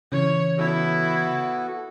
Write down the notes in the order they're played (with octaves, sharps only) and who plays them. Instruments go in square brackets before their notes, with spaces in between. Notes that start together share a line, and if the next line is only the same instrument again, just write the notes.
[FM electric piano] C#3 E3 G#6 [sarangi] C#5
[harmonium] B3 F#4 A4 [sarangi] E4